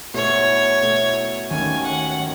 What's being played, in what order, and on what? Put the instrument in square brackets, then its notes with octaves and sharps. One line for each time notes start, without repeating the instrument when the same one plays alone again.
[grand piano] B2 A3 E4 [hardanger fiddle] C#5
[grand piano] B2 A3 E4
[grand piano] D#2 D#3 A3 C#4 F#4 [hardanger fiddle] G#5
[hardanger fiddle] F#5
[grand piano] D#3